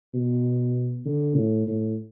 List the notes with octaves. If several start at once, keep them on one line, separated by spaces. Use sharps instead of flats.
B2
D3
A2
A2